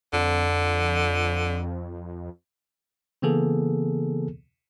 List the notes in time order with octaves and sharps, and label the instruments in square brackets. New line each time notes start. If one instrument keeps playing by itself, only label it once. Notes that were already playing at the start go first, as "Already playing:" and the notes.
[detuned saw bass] F2 [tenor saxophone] D3
[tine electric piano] C#3 E3 A#3 B3 G#4 A4